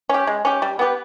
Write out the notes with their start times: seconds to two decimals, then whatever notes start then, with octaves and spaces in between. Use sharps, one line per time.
0.09 C#4 G4
0.27 G#3
0.45 C#4 G4
0.62 G3
0.79 B3 G4 B4